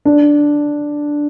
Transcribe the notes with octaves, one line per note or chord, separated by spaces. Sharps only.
D4